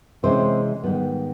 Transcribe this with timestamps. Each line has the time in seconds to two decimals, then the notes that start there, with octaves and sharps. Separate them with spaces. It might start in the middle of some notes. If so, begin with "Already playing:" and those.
0.23 C3 E3 G#3 C4 C#4 C5
0.83 G#2 D#3 G3 B3